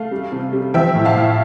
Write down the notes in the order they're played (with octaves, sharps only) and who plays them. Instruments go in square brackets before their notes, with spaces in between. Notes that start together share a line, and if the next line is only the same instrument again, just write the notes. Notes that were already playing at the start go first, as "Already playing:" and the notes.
Already playing: [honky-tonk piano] A3 F5
G3
C3
G3
F3 E5 G5
A2
F5 A5
A2